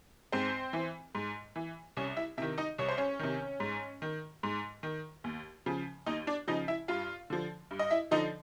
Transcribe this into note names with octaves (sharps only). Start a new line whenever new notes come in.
G#2 C4 C5
E3
G#2
E3
C2 C#4 C#5
E4 E5
C3 D#3 E4 E5
D#4 D#5
C2 C#5
C5
C#4 C#5
C3 D#3
G#2
D#3
G#2
D#3
D#2
C#3 F3
D#2 D#4 D#5
D4 D5
C#3 F3 D#4 D#5
E4 E5
G2 F4 F5
D3 F3
G2
D#5
E4 E5
D3 F3 D#4 D#5